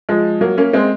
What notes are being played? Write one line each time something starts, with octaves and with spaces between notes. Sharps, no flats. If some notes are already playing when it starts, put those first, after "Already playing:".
F3 G#3
F#3 A#3
A#3 C#4
G#3 C4